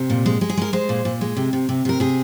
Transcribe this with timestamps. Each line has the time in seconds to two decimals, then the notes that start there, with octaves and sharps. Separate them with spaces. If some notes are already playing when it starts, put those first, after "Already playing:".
Already playing: C3
0.10 A#2
0.26 G#3
0.41 G#3
0.50 G#4
0.57 G#3 A#4
0.73 G#3 C5
0.89 A#2
1.05 A#2
1.21 G#3
1.37 C3
1.53 C3
1.69 C3
1.85 C3 A#4
2.00 C3 G#4